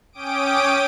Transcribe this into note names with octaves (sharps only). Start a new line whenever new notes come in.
C#4 G5 D6 D#6 D7